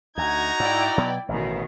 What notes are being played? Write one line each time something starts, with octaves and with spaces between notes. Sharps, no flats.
D2 D#4 F#4 A#5 G#6
G#2 E4 D5 G5
B2 F#3 B3
A1 B2 D#3